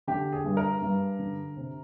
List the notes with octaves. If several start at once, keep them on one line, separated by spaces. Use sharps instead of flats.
D3 G4
G#4
G2
A#4
G2
D3
C3